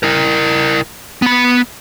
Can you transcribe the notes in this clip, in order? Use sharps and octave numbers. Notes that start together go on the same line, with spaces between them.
E4 A#4
B3 B5